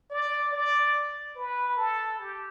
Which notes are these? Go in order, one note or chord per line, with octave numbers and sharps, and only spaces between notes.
D5
D5
B4
A4
G4